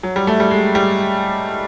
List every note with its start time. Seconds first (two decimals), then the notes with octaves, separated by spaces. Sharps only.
0.03 F#3
0.16 G3
0.27 A3
0.40 G3
0.51 G#3
0.75 G3